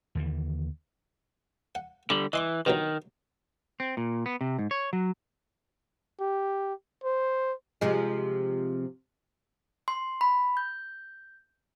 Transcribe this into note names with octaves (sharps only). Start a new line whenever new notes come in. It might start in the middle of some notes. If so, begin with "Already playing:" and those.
D#2 D3 E3
F#5
D3 G3 D6
E3 D#5 C6 D6
G2 B2 D#3 F#3
C4
A#2
B3
C3
G#2
C#5
F#3
G4
C5
C3 F3 G#3
C6
B5
G6